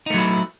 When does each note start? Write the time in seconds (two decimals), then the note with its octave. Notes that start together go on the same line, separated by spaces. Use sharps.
0.06 D#4
0.10 A3
0.14 F#3
0.18 E4